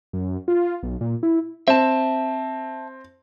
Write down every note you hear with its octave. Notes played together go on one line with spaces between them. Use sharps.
F#2
F4
B1
A#2
E4
C4 E5 A5